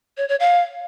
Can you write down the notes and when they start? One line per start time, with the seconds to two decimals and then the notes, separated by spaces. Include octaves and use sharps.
0.17 C#5
0.29 C#5
0.40 F5